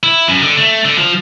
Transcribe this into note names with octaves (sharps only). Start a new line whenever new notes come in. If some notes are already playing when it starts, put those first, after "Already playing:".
E4
F#2
D3
A3
D3
F3